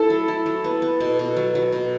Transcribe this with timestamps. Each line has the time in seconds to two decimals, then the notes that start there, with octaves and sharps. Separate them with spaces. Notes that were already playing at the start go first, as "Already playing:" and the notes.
Already playing: A3 E4 A4
0.10 F#3
0.28 E4
0.46 F#3
0.64 B3
0.82 B3
1.00 B2
1.19 B2
1.37 F#3
1.55 F#3
1.72 B2